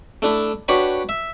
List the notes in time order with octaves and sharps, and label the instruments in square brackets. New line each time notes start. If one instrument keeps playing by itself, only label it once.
[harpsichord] A3 D4 E4
D4 F#4 G4 B4 C#5 B5
E5